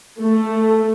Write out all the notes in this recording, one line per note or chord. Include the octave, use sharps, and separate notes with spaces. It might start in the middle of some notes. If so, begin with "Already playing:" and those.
A3